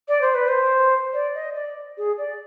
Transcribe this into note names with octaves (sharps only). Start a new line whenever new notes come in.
D5
C5
B4
C5
D5
D#5
D5
G#4
D5